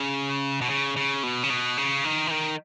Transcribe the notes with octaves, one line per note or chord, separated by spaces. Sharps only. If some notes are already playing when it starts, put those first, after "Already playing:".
Already playing: C#3
B2
C#3
C#3
B2
C#3
B2
C#3
D#3
E3
D#3